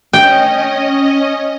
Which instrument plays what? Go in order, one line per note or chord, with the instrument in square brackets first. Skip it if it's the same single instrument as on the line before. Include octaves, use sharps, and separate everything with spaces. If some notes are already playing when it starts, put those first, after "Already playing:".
[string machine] C#4 D#5 [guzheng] G5